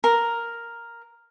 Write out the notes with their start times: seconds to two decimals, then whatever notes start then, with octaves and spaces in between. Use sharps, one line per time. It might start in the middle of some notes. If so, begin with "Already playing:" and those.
0.04 A#4